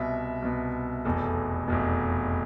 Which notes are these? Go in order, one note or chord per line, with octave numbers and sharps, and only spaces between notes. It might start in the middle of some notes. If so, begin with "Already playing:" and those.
Already playing: C2 B2 E5
C2 B2
F1 E2 B2 A4
F1 E2 B2